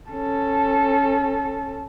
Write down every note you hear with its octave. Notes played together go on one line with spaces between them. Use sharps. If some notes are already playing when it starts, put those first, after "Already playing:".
C#4 A4